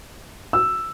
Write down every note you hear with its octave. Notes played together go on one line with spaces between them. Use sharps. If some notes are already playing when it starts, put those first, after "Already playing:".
E6